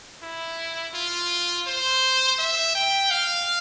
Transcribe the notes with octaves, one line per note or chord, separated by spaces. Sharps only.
E4
F4
C5
E5
G5
F5